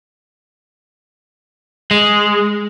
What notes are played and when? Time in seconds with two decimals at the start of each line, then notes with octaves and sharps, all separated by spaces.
1.91 G#3